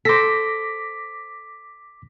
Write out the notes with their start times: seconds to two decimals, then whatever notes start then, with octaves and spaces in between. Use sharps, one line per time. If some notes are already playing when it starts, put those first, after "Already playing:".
0.05 A4 C5 D6 A#6 B6